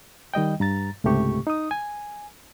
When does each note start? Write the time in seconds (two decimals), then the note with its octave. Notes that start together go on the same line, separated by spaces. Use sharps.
0.34 D#3 G3 D#5 G5
0.60 G2 A#5 A6
1.04 C#2 G#2 C3 A3 G4 C#6
1.47 D#4 D#6
1.71 G#5